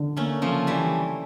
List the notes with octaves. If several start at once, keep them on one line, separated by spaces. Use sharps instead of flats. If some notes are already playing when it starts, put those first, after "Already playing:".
Already playing: D3
A3 A#3 C#4
C#3 F3 A3
E3 G3 D4